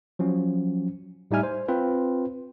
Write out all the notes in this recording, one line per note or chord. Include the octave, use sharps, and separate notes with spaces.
F3 F#3 C#4
A2 G3 D#4 E5 G#5 F6
C5
C4 F4 B4